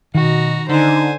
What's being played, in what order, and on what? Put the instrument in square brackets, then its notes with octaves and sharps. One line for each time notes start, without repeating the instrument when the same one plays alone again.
[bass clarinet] B2 [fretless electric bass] D#3 [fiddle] F#4 A#5
[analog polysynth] D3 [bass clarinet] D#4 [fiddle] C5 G#5